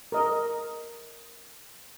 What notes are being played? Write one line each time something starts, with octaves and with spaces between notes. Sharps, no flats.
A#4 D#5